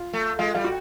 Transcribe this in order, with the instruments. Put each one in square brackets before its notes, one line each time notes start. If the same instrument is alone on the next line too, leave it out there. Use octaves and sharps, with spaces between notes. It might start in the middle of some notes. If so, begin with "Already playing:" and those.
Already playing: [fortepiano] F4
[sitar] A3
[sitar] G#3 [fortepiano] F4
[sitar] G3 [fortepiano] F4
[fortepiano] F#4